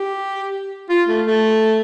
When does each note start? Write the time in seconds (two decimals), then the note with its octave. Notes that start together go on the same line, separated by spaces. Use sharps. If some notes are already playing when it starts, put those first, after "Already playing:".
Already playing: G4
0.89 F4
1.08 A3
1.26 A3